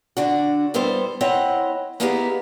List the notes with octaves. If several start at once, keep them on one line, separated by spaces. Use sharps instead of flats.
D3 D4 F#4
G3 B3 E4 A4 C5
C4 E4 C#5 D#5 F#5
A#3 B3 D#4 E4 G4 G#4